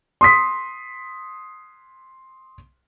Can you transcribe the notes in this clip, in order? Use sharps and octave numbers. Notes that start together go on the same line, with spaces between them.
C6 D#6 B6